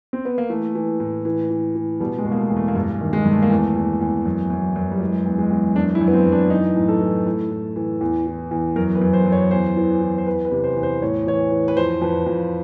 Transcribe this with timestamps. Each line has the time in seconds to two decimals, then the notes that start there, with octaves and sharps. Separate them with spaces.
0.13 C4
0.25 B3
0.38 A#3
0.50 E3 A3
0.75 E3
1.00 A2
1.25 E3
1.50 E3
1.75 E3
2.00 B2 G3
2.19 G#3
2.25 B2
2.32 A#3
2.37 A3
2.50 E2
2.57 A3
2.68 A#3
2.75 G2 A3
3.00 D#3
3.13 G#3
3.25 G2
3.32 A3
3.42 A#3
3.50 E2 A3
3.76 E2
4.01 E2
4.25 F#2
4.50 F#2
4.76 F#2
4.92 G3
5.01 E3 G#3
5.26 E2
5.38 G#3
5.50 E2
5.75 F#2 D4
5.95 E4
6.01 F#2
6.08 B3
6.13 C4
6.26 F#2
6.32 D4
6.50 E3 D#4
6.76 A2
6.89 A4
7.01 E3
7.26 A2
7.51 A2
7.76 E3
8.01 E2
8.27 E3
8.51 E2
8.76 F#2 A#4
8.95 B4
9.02 F#2
9.13 C5
9.26 F#2
9.32 C#5
9.51 E2 C5
9.76 E3
10.01 E3
10.18 C5
10.26 E2 B4
10.45 B4
10.51 C3
10.64 C5
10.77 E2
10.83 C5
11.02 A2 C#5
11.27 E3 C#5
11.52 E3
11.68 B4
11.77 F2 C5
12.02 F2 B4
12.27 F2 F4